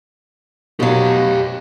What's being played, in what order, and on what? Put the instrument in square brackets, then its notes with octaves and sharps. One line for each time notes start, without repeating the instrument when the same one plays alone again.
[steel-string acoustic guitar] B2 F#3 [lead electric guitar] G4 F5